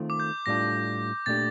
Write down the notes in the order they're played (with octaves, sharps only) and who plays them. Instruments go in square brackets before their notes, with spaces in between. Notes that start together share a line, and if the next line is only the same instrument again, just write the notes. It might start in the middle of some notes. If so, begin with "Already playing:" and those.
Already playing: [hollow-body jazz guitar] D#3 A3 C4 F4 A4
[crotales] D6
G6
[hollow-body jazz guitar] A2 G3 D4 F4 A4 [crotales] A#6
[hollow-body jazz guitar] A#2 A3 D4 G4 [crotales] A6